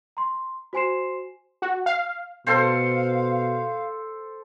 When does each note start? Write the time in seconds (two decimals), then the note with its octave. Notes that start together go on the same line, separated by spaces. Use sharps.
0.17 A#5 C6
0.73 F#4 C5 G#5 C6 C7 E7
1.62 F#4
1.86 F5
2.47 B2 A4 C5 F5